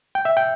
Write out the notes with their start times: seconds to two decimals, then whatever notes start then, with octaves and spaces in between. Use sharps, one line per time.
0.15 G5
0.25 E5
0.37 G5